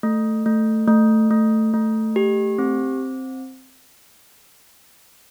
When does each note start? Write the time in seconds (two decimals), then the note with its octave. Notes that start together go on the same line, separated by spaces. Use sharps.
0.03 A3
0.46 A3
0.88 A3
1.31 A3
1.74 A3
2.16 G4
2.58 C4